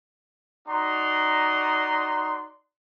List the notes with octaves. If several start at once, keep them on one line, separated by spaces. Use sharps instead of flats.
D#4 F#4 D5 A#5 C6